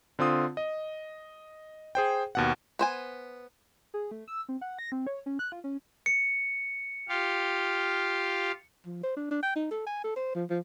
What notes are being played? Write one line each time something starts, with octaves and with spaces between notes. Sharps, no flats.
D3 C4 F4 D#6
D#5
G#4 C5 G5
D#2 B2 F#5
B3 C5 G#5
G#4
A3
E6
C4
F#5
A#6
C4
C#5
C#4
F#6
F4
C#4
C#7
F4 G4 F5
F3
C5
D4
D4
G5
D#4
A4
G#5
A4
C5
F3
F3